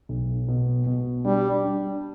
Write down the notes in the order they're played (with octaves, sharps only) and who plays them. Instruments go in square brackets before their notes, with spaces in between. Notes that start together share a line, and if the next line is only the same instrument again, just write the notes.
[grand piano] B1
B2
B2
[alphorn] G3 [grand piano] D4
[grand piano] D4